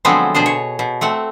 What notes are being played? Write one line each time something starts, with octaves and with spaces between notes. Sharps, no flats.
D3 F3 F#3 G#3 B3 C4
B2 D4 G#4 C5
C#5
B2
A3 C4 F#5